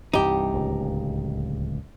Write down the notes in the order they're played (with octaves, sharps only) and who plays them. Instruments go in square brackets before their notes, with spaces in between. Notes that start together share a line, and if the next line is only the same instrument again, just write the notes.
[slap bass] C2 G2 E3 [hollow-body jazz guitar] D#4 G4
[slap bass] D1 C#2